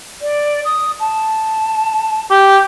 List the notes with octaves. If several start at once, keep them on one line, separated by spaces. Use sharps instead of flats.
D5
D#6
A5
G4 G6